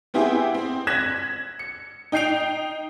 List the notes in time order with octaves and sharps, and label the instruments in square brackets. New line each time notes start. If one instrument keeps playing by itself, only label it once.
[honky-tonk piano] B3 C4 E4 G4 G#4 G5
C4
F#6 G#6 A#6 B6 E7
C#7
D#4 G5 G6 C7 D7 F7